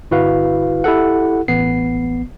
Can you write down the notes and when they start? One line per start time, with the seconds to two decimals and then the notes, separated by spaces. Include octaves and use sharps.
0.11 G1 E4 F#4 B4 F5
0.84 E4 G4 A4 F#5
1.48 A1 B3 C7